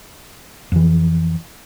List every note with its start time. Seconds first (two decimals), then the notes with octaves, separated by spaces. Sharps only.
0.72 F2 E3